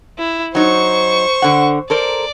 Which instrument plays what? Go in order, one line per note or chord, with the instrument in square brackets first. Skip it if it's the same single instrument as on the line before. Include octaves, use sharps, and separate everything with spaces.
[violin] E4
[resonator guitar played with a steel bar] F#3 D#4 [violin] C5 C#6
[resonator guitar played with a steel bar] D3 F#5
[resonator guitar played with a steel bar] A4 A#4 C5 [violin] D5